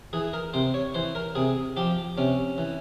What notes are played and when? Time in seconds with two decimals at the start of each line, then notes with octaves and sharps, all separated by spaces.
0.13 E3 G#4
0.33 A#4
0.54 C3 C5
0.74 C#5
0.94 E3 C5
1.15 A#4
1.35 C3 G#4
1.77 F3 G4
2.18 C3 C#4
2.58 E3